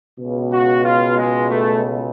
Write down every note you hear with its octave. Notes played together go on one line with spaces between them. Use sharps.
C#2 B2
F#4
F4
G#3
A3